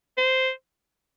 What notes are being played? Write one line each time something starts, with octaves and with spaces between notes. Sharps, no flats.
C5